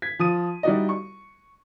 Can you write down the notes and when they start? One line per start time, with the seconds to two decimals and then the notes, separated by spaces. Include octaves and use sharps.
0.02 G#6 B6
0.19 F3 D#6 D#7
0.63 G3 D#4 E4 F#4 D5 D#5
0.89 C#6